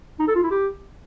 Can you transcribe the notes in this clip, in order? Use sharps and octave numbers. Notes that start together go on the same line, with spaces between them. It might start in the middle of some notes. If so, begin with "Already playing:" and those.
D#4
A4
F4
E4
G4